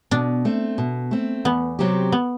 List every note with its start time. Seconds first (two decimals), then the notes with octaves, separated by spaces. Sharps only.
0.11 B2 D4
0.45 A3 C4
0.78 B2
1.11 A3 C4
1.45 E2 B3
1.79 C3 F#3 C4 G4
2.12 B3